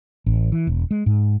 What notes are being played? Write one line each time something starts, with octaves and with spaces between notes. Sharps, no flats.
A1
E3
E1
G#3
G#2